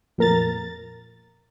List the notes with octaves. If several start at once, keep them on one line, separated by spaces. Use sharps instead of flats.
F2 A#2 A#4 A#5 A6